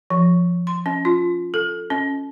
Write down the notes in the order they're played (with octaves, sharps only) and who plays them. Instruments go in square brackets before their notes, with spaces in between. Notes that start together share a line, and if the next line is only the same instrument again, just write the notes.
[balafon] F3
C6
C#4
F4
A4
C#4